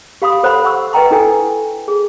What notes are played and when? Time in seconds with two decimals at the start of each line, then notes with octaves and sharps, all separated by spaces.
0.22 G4 F5 B5 C6 D#6
0.43 A4 C5 F#5 B5 C6
0.64 F#5 C6 C#6 E6
0.93 B4 D#5 F#5 G5 A#5 C6
1.11 D4 E4 A4 G5 G#5
1.88 G#4